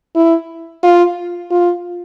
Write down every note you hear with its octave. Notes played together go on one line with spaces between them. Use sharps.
E4
F4
F4